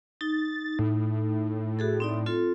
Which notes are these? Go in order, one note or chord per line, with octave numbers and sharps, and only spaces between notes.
D#4 A6
A2
F#4 G#4 A4
C4 D#4 D5
C4 F4 A4